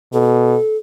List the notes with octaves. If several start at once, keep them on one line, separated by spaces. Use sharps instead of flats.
B2 A4